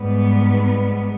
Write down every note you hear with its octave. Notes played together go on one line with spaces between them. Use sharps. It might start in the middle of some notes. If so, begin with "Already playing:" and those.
Already playing: G#2 G3 B3